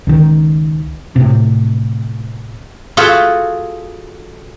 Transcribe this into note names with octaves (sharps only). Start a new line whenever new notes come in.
C#2 D#3
A2 C3
F4 F#4 G#4 A4 E5 F#5